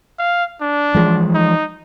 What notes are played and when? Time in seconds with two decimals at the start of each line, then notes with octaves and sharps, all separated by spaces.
0.19 F5
0.61 D4
0.95 E3 F3 G#3
1.35 D#4